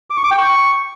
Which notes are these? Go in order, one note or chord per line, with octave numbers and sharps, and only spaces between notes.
D6
C#6
D6
G5
C#6